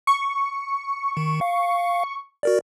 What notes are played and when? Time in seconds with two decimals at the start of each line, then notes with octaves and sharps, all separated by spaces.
0.07 C#6
1.17 D#3
1.41 F5
2.43 F#4 A#4 D5